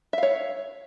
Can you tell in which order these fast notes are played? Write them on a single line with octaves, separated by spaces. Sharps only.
E5 F5 C#5